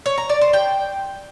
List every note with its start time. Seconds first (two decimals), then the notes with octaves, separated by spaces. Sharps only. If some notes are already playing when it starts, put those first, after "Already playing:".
0.06 C#5
0.18 A#5
0.29 D5
0.41 C5
0.53 G5